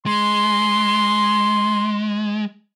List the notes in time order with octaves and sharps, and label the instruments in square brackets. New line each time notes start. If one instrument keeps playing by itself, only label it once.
[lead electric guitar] G#3 [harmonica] C6